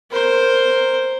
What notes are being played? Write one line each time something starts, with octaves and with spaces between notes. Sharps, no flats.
A#4 C5